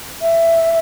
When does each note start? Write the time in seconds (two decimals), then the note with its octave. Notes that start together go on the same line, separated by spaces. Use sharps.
0.21 E5